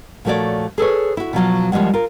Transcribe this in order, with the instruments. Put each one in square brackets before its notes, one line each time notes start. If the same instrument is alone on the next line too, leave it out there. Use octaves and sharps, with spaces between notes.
[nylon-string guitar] A#2 F3 A3 F#4 C#5 D5
G#4 A4 B4 C#5
E4 F#4
B2 F3 F#3 F4
D#2 F3 G3 G#3 F#5
F4 A#4